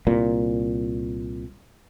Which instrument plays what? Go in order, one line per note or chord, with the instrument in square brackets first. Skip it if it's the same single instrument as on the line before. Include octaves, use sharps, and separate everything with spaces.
[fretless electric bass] C2 A#2